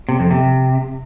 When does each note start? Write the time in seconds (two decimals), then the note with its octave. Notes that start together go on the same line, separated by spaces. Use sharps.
0.09 C3
0.20 F2
0.31 C3